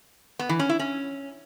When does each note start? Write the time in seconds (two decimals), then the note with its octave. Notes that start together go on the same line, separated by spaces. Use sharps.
0.39 B3
0.49 E3
0.59 C#4
0.69 E4
0.79 C#4